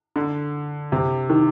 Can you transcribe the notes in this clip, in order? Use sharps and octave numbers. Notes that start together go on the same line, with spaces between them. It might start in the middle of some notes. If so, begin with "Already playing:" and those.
D3
C3
D#3